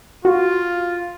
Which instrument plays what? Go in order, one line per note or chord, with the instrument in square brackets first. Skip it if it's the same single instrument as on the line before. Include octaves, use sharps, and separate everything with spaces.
[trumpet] F4 [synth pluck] F#4